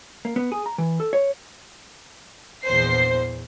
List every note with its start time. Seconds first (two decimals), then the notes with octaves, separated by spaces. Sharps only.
0.25 A#3
0.36 B3
0.52 G#4
0.66 A#5
0.78 E3
1.00 A4
1.13 C#5
2.65 A#1 E2 C5 C7